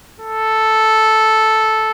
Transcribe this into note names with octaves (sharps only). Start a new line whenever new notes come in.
A4